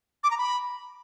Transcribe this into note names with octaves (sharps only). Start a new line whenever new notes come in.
D6
A#5
B5